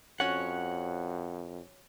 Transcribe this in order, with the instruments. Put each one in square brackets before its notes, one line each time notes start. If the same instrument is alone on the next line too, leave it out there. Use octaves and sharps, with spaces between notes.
[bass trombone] F2 [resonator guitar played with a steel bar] C#4 F#4 C#5 [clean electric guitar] F#5